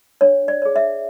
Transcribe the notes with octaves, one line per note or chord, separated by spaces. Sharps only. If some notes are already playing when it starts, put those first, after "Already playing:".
D4 C#5
D5
G#4 C#5
E5